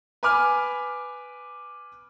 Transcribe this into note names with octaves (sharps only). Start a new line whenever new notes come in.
B4 G#5 B5 D6 F6